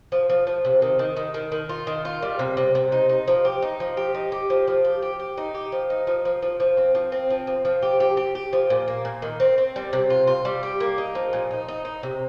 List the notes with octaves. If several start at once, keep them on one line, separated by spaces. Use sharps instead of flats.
F3
F3
F3
C3
D#3
D#3
D#3
D#3
D#3
F4
D#3
F4
G3
C3
C3
C3
D#4
D#4
F3
G4
D#4
F3
G4
D#4
G4
F3
F3
G4
G4
G4
D#4
G4
F3
D#4
F3
F3
F3
F3
C4
F3
C4
F3
F3
F3
G4
G4
G4
G4
F3
A#2
A#3
A#2
D#3
C4
C4
G3
C3
F4
F4
G3
G4
A#3
D#4
F3
A#2
D#4
D#4
D#4
C3